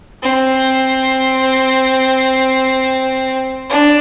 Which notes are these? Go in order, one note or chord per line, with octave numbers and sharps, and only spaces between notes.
C4
D4